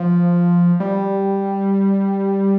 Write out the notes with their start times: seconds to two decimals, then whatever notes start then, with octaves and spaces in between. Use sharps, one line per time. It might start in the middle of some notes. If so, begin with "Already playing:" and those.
Already playing: F3
0.80 G3